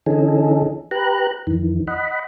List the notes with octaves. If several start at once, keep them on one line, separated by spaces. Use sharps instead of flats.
D3 E3 C#4 D#4 G#4 A4
G4 B4 A#5 F#6
F2 D#3 E3
D#5 F#5 B5